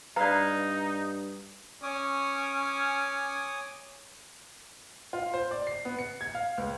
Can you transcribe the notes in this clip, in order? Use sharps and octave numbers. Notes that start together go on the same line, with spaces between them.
G2 D#4 B4 D5 F5 A#5
C#4 C#5 G#5 D6 D#6
F4
C5
D5
C7
B3
C#7
G#6
F5
C#2